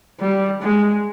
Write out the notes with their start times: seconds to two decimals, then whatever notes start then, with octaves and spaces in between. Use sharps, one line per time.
0.20 G3
0.62 G#3